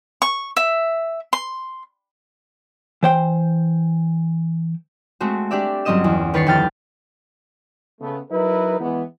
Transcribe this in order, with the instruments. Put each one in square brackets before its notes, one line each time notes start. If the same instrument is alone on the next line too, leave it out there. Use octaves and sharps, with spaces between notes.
[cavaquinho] C#6
E5
C6
[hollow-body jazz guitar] E3 C5 G5
[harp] G#3 A3 C4 F#4
D4 G4 D5 E5
G1 F#3 C4 C#4 D#5 E7
E2
D#3 B4 C#5 A6 C7 C#7
F1 D2 G5 F6 A6
[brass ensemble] C#3 A3 B3
F#3 D#4 E4 A#4 B4
E3 G#3 B3